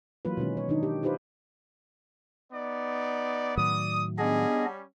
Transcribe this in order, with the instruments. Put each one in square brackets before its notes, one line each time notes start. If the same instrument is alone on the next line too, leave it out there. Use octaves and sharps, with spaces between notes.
[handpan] E3 F#3 A#3 F4 B4
B2 D#3 G#3 C#4
C#5
D#3 D4 D#4
G4
D#4 F4 G4 B4 C5
[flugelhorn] B3 [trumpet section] D#4 D5
[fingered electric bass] A2 D#3 F#3 [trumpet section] D5 D#6
[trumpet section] G3 C#4 [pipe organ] B3 D4 D#5 [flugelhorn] G#4